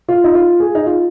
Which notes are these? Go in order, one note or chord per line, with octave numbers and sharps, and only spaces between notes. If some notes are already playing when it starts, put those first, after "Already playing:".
F4
D#4
F4
G#4
D#4
F4